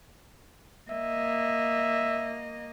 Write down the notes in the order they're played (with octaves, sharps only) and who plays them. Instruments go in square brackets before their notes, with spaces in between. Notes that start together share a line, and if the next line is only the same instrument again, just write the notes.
[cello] A#3 D#5 [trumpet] E5